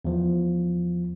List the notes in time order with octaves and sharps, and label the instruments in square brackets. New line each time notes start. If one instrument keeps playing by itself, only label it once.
[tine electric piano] E2 F3